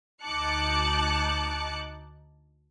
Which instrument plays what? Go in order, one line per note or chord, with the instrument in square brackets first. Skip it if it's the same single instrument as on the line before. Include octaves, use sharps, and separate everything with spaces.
[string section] D2 D#4 A5 D6 F#6 C#7